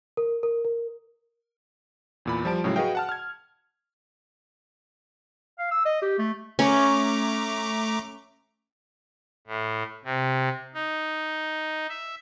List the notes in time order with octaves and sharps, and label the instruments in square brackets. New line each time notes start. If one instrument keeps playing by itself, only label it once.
[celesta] A#4
A#4
A#4
[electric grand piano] E2 A#2 B5
F3 G3 A5 D7
A2 C#3 F#3 G#3
F#4 G#4 B4 D#5 F5 G5
F#5 A5 F6
F6 G#6
[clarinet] F5
E6
D#5
G4
A3
[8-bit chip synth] A3 A#5 D6 [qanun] C#4
[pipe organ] A2
C3
D#4
E5